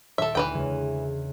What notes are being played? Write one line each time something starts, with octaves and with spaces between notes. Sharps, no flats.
D#1 A4 E5
D2 E3 B4 G5
E2 C#3 G#3